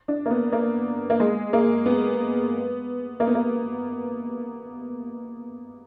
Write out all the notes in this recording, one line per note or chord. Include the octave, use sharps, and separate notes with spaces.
D4
A#3
B3
A#3
A#3
G#3
A#3
B3
A#3
B3
A#3